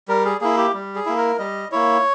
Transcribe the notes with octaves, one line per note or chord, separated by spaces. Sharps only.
G3 A#4
G#4
A#3 E4 G#4
G4
G3
G#4
A#3 E4
A#4
G3 D#5
A#3 E4 C#5